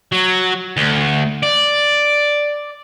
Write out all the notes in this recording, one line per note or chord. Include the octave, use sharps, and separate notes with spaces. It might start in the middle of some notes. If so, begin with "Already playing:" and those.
F#3
D2
D5